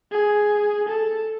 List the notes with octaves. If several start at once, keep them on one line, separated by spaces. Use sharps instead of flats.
G#4
A4